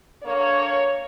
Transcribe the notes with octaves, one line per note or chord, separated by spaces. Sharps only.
D3 A#3 C#5